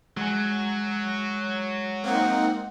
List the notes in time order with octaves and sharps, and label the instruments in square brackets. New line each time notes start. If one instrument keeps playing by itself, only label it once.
[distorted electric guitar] F#3 [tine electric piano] G#3 G#5
[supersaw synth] A#3 C4 D#4 [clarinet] F#5